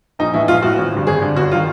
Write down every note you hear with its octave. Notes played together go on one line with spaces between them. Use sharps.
A#1 D#4
A2 E3 E4
A#1 F4
A2 E3 F#4
G#1
G2 D3
G#1 G#4
G2 D3
G1 F#4
F4
D#3